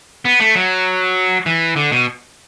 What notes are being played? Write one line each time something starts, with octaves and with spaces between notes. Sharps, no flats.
B3
A3
F#3
E3
D3
B2